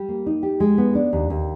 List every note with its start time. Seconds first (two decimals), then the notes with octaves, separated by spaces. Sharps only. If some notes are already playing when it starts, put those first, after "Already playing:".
Already playing: G3
0.09 A#3
0.26 D#4
0.43 G4
0.60 G#3
0.78 B3
0.95 D4
1.13 D#2
1.30 D#2